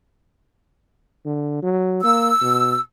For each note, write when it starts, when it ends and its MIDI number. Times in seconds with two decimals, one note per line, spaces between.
1.25 1.61 50
1.62 2.02 54
2.04 2.31 58
2.04 2.81 88
2.41 2.76 47